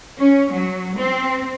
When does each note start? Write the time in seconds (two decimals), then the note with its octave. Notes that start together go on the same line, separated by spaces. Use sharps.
0.18 C#4
0.52 F#3
0.97 C4